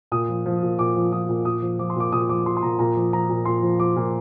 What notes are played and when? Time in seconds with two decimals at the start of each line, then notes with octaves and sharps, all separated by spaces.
0.12 A#2 D#6
0.29 F3
0.46 F3
0.63 A#2
0.79 A#2 D6
0.96 F3
1.12 F3 D#6
1.29 A#2
1.45 A#2 D#6
1.62 F3
1.79 F3 D6
1.90 C6
1.96 A#2 D6
2.12 A#2 D#6
2.29 F3 D6
2.46 F3 C6
2.57 C6
2.63 A#2 A#5
2.79 A#2 A#5
2.96 F3
3.13 F3 A#5
3.29 A#2
3.45 A#2 C6
3.62 F3
3.79 F3 D6
3.96 A#2